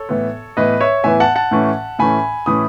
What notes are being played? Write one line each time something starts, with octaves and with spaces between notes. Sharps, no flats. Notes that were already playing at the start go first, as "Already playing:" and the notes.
Already playing: A4 C#5
A2 E3 B3
A2 E3 B3 B4 D#5
C#5 E5
A2 E3 B3 E5 G#5
F#5 A5
F#5 A5
A2 E3 A3 C#4
A2 E3 A3 C#4 G#5 B5
A2 E3 A3 C#4 B5 D#6